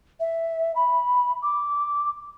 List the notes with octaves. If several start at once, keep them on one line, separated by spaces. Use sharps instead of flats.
E5
B5
D6